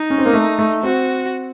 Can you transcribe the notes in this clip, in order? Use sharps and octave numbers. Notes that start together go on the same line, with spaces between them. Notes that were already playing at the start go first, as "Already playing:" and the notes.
Already playing: D#4
C#4
C4
A#3
A3
A3
C4 F#4